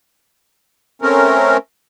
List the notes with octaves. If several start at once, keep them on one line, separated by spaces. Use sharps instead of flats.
A3 C4 C#4 A#4